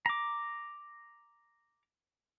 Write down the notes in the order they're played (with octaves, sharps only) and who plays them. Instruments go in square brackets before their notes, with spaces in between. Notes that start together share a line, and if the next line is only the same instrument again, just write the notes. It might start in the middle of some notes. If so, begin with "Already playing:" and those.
[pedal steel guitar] A#5 D6